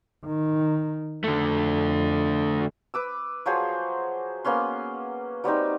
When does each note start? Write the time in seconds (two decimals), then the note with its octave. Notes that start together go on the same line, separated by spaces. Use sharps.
0.25 D#3
1.24 F2 D3 A3
2.94 B4 D6 E6
3.46 F3 F#3 G#4 C5
4.45 A#3 B3 C#4 C6
5.44 F#3 G3 C4 D#4